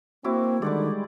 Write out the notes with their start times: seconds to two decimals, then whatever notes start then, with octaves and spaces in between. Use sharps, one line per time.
0.24 A#3 C4 E4 F#4 D6
0.62 D3 D#3 G3 G#3 D5 F#5 D6